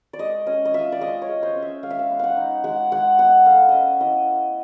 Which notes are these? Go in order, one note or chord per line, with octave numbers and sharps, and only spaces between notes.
D5
G#3 D#5
C#4 D#5
D#5
F4 E5
D5
G#3 D#5
C#5
G#3
C5
C#4
E5
G#3 F5
E5
F5
B3
F5 F#5
D#4
G#3 F#5
G#3 F#5
B3 F#5
A3 F5
C#4 D#5 E5
E4 D#5